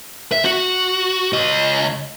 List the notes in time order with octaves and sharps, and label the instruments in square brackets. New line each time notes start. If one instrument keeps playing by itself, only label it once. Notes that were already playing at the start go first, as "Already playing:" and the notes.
[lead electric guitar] E5
F#4
C#2 D#5